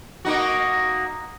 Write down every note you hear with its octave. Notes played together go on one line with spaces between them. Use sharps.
A#3 D#4 F#4